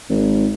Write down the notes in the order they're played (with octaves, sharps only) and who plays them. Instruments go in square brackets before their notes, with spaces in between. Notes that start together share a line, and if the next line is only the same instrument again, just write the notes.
[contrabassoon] G#1